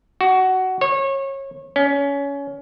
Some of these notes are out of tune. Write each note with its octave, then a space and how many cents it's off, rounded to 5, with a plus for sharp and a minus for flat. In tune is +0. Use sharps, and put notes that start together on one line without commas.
F#4 +15
C#5 -25
C#4 +20